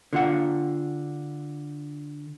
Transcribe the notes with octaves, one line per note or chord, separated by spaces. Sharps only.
D3 F4 F#5